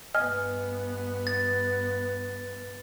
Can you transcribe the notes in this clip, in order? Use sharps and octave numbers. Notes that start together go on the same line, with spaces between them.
G2 B3 D#5 G#5 F6
A6